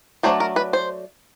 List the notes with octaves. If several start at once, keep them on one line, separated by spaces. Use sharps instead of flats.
F#3 A3 D4 C5
A#4
B4
C5